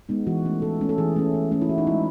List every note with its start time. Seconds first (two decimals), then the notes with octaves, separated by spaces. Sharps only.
0.09 G#3 B3 D#4
0.27 E3 F#4
0.45 A3 C#4
0.62 E3 A4
0.81 A3 C#4
0.89 A4
0.98 E3 G#4
1.16 A3 C#4
1.34 E3
1.52 A3 C#4
1.62 E4
1.69 E3 F#4
1.78 D#4
1.87 G#3 C#4 E4